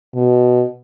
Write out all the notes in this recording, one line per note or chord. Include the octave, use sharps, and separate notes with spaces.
B2